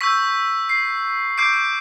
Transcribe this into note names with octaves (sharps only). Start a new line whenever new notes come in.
C#6 E6 G6 B6
C7
D6 G6 C7 D7